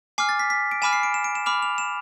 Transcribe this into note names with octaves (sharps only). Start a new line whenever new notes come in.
G#5 D6 F6 C7
A6
B6
B6
D7
G#5 B5 D6 F6 E7
C7
D7
E7
D7
E7
B5 D6 F6 F7
F7
E7